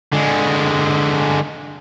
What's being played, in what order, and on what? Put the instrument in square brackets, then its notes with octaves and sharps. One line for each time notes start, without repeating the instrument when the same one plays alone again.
[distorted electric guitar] D3 G#3